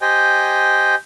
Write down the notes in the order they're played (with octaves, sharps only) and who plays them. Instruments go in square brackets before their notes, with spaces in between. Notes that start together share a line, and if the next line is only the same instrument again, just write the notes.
[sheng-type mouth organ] G4 C5 D#5 G5 G#5